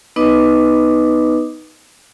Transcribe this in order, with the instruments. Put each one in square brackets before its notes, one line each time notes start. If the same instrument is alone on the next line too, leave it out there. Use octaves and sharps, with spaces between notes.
[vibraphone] B3 D#4 B4 D#5 D6 D#6